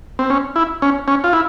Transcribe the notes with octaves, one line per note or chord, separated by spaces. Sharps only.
C4
C#4
E4
C#4
C#4
F4
E4